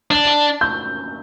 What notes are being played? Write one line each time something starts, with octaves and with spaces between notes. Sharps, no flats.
D4
G6